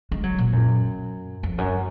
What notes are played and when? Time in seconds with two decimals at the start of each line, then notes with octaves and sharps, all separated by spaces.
0.11 G#3
0.23 F#3
0.39 A#2
0.53 F#2
1.43 F2
1.58 F#2